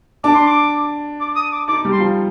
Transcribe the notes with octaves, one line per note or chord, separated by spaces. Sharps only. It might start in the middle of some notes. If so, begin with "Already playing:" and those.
D4 D6
C6
D6
D6
D#6
D6
D#4 D6
G3
C6
F3